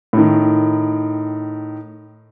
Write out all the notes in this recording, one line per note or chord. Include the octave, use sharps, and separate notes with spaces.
A2 D#3